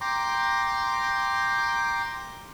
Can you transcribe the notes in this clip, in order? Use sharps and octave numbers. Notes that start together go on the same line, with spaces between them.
G5 A#5 C6 D6